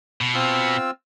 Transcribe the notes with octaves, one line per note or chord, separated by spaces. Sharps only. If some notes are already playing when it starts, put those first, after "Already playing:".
B2
C4 F4 E6